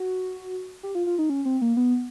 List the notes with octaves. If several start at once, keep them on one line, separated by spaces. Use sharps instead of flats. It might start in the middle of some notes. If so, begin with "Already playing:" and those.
Already playing: F#4
G4
F4
F4
D#4
C#4
C4
A#3
B3